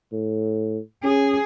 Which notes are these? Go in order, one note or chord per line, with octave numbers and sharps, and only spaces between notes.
A2
C#4 G#4